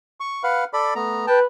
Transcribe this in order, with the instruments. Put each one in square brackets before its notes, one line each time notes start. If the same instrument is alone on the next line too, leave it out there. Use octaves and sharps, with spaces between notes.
[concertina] C#6
B4 F5 F#5
A4 D5 B5
A3 B3 A#5
[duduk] B4 [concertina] G5 A5